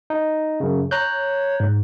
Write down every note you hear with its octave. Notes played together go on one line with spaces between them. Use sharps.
D#4
F#2 C#3
C#5 A#5 F#6 G6
G#2